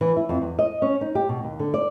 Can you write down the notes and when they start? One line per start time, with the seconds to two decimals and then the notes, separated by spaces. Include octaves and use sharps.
0.01 E3
0.16 E4
0.29 F2
0.42 E2
0.59 D#5
0.82 C#4
1.01 D#4
1.15 G4
1.29 B2
1.43 D#2
1.59 D3
1.74 D5